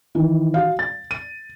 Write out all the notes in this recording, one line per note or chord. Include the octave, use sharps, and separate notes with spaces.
D#3 E3
F#4 F5
A6
D#7